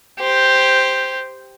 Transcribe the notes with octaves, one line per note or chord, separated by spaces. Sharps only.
G4 C5